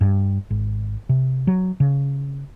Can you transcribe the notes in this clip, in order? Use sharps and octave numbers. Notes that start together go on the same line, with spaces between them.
G2
G#1
C3
F#3
C#3